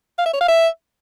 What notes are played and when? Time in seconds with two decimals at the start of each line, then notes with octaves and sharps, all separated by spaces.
0.18 F5
0.26 E5
0.33 C#5
0.41 F5
0.48 E5